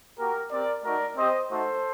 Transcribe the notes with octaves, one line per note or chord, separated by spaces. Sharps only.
A#3 F#4 G4 A#4
C4 G4 A#4 D5
A3 D#4 F#4 A#4 D5
C4 G4 C5 D#5
A3 D#4 F#4 A4 C5